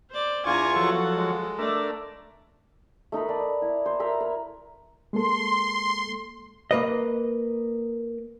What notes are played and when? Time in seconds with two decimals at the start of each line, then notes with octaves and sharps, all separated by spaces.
0.11 C5 D5
0.46 E2 D4 F4 G#5 A#5 C#6
0.76 F3 F#3 A4 C#5 F#5
1.16 G#3
1.59 A3 D4 A#4 D5 E5
3.12 A3 D#4 A#4 B4
3.29 A#4 D5
3.62 E4
3.86 C5
3.99 A#4 E5 A#5 B5
4.20 A#4
5.13 G#3 A#3 A4 C6
6.71 A#3 B4 D#5